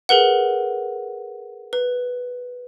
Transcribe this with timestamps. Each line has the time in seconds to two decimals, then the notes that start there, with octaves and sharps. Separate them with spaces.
0.09 G#4 A#4 B4 F#5
1.73 B4